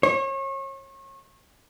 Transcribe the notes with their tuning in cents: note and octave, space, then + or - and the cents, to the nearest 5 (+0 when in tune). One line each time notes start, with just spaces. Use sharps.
C#5 -35